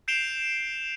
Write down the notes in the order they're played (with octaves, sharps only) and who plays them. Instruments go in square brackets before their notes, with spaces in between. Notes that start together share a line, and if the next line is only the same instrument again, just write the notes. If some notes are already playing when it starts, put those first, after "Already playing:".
[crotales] G6 C7 D7 E7 F7 G7